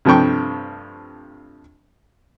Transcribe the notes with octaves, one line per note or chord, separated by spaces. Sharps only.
G2 C3 F3 A3 G5 C#6